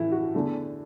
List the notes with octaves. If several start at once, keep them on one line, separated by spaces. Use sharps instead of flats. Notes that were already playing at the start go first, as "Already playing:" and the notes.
Already playing: A2 E3 A3 E4
F#4
E2 D3 A3